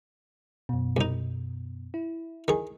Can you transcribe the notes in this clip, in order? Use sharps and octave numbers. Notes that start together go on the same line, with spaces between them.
F#2 B2
C2 D#4
E4
D#3 G#4